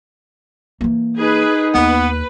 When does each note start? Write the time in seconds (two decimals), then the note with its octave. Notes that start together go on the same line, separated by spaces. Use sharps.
0.81 E3 A#3
1.18 D#4 G#4 B4
1.74 D#2 B3 B4